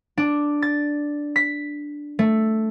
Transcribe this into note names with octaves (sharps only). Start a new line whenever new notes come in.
D4
A6
B6
A3